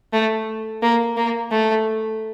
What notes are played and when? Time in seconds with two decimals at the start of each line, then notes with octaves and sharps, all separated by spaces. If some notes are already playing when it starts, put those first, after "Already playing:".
0.13 A3
0.82 A#3
1.17 A#3
1.51 A3